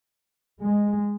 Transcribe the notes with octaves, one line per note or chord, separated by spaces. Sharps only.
G#3